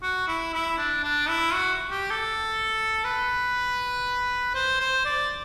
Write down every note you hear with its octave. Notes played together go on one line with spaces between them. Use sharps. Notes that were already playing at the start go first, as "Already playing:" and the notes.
F#4
E4
E4
D4
D4
E4
F#4
G4
A4
B4
C5
C5
D5